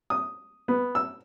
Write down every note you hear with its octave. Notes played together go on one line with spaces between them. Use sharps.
D#6
B3
E6